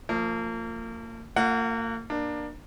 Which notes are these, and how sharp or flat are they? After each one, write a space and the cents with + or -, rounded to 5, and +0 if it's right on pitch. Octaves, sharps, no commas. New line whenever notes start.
F3 +0 A#3 -35
A#3 -35 F4 +5 F#5 +0
A#3 +20 D4 +20